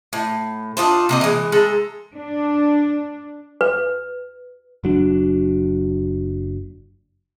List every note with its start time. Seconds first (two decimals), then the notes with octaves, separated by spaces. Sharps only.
0.13 A2
0.77 D4 D#4 F4 C5
1.09 C3 A#3 D#5
1.21 E3 G#3
1.52 G#3 A4 A#5
2.14 D4
3.61 B4
4.84 F#1 F#3 D4